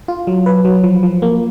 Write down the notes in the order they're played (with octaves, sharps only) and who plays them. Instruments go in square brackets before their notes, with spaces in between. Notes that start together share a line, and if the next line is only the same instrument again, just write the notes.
[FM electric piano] F4
F#3
B4
F#3
F3
F3
A#3